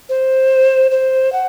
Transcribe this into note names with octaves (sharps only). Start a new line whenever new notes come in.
C5
C5
F#5